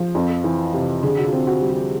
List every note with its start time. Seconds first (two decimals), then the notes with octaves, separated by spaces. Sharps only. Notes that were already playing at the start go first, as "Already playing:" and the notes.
Already playing: F3
0.15 F2
0.44 E3
0.73 C3
1.03 D3 G#4
1.18 F#4
1.25 F4
1.32 C4
1.47 F#4
1.62 G3
1.69 G4